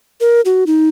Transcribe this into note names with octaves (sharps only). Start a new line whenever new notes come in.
A#4
F#4
D#4